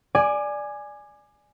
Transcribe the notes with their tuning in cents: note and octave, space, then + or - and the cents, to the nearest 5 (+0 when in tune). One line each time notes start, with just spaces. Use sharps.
D5 +5 G#5 +0 D6 +30